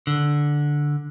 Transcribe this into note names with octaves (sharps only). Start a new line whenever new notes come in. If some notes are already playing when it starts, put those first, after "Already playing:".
D3